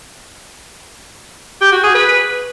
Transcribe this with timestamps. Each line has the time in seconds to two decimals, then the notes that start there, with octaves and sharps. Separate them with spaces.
1.61 G4
1.72 F#4
1.83 G#4
1.94 B4